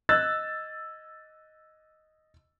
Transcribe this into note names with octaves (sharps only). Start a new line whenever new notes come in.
D#5 E6 F#6 G#6 A6